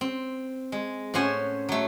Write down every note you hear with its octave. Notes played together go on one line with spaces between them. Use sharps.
C4
G#3
A2 C#4 C5 F#5 G#5
F#3 A3